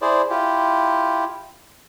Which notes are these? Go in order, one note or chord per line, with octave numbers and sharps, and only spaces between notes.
E4 G#4 C5 D5
E4 F4 G4